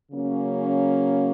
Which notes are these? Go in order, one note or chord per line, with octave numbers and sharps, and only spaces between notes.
C#3 F#3 A#3 C#4